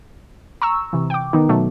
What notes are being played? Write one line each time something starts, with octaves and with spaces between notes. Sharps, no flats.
A#5 C#6 E6
C3 E3
G5 D6
D#3 B3 D#4
B2 F#3 A3